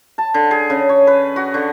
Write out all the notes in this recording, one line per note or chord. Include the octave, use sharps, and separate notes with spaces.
A5
D3
G#4
C#3
C#5
B4
F#4
D3